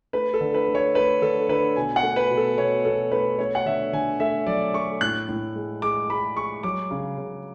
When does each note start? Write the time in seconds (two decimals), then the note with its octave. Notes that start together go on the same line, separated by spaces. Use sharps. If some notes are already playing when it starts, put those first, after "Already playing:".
0.13 A3 B4
0.34 A4
0.41 D3
0.54 B4
0.68 A3
0.75 C#5
0.95 A3 B4
1.22 D3 A4
1.49 D3 B4
1.76 B2 G#5
1.96 F#5
2.03 A3
2.16 B4
2.30 B2
2.37 A4
2.57 B2 C#5
2.85 B2 A4
3.11 A3 B4
3.39 A3 C#5
3.55 F#5
3.66 D3 E5
3.93 D3 G#5
4.20 A3 E5
4.47 F#3 D5
4.74 A3 C#6
5.01 A2 F#6
5.29 A2
5.56 G#3
5.82 G#3 D6
6.10 G#3 B5
6.37 G#3 C#6
6.63 F#3 D6
6.91 C#3
7.18 C#3